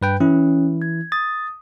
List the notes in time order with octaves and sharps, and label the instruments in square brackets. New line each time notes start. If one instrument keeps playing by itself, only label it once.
[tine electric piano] G2 B4 G5
[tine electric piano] E3 E4 [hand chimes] C#4
[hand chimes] G#6
[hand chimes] D#6 [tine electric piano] A6